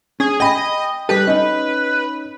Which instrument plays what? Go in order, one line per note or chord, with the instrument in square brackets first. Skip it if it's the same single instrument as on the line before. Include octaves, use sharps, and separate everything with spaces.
[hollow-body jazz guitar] C#4 [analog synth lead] G#4
[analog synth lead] D#5 [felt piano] G5 B5 [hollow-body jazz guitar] G#5
[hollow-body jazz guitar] G3 G4 A4 [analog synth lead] B4
[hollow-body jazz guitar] C#4 D#4 [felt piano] D#5